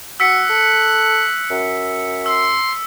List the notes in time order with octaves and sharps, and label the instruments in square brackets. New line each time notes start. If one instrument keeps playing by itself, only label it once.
[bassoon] F#4 [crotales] E6 B6 C#7 [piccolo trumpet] F#6
[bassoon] A4
F#2
[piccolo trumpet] C6 [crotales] E6